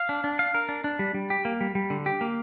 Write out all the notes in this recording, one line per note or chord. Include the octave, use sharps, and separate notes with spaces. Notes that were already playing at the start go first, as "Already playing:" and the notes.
Already playing: F5
D4
D4
F5
A#4
D4
D4
G3
G3
G4
A#3
G3
G3
D3
G4
A#3